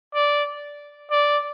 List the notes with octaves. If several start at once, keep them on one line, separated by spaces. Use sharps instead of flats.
D5
D5